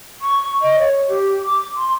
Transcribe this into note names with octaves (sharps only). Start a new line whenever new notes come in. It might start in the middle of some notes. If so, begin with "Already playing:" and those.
C#6
D#5
C#5
G4
D6
C6